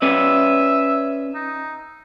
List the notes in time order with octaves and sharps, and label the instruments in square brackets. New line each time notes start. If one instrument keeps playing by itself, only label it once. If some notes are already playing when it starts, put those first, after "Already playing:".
[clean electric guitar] C#4 B4 D5 [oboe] E5
[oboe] D#4